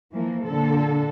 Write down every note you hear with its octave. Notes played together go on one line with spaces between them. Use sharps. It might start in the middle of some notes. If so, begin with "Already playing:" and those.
E3 F3 A#3
A#2 D3 A4